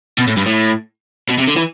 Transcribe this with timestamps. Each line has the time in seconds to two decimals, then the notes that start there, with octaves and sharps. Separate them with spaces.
0.18 B2
0.27 A2
0.37 G2
0.46 A2
1.29 B2
1.38 C3
1.48 D3
1.57 E3